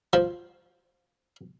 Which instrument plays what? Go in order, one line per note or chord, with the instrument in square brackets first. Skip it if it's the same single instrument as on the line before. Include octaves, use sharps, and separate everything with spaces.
[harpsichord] F3